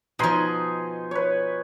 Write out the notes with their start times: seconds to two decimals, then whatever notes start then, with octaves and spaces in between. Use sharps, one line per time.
0.19 B2 F3 D#4 G#5 C6
1.11 B4 C#5